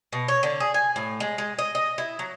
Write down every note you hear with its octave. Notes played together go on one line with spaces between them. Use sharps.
B2
C#5
D3
G#4
G#5
A2
G#3
G#3
D#5
D#5
E4
F#3